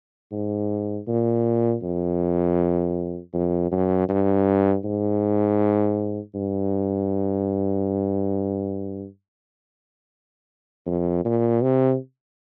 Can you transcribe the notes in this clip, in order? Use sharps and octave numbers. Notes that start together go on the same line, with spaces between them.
G#2
A#2
F2
F2
F#2
G2
G#2
G2
F2
A#2
C3